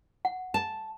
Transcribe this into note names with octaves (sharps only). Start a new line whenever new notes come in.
F#5
A5